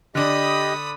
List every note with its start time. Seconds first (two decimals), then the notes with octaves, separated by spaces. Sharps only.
0.15 D3 D4 G4 D#5 B5 D#6